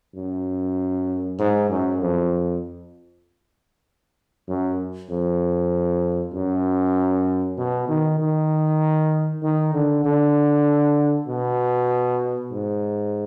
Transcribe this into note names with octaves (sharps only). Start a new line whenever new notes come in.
F#2
G#2
F#2
F2
F#2
F2
F#2
B2
D#3
D#3
D#3
D3
D3
B2
G#2